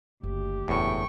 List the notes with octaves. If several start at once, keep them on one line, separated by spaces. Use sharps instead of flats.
F#1 D2 G4
F#1 E2 A2 D4 G5 C#6